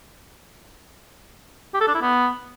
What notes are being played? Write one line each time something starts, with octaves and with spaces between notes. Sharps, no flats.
G4
A4
D4
E4
B3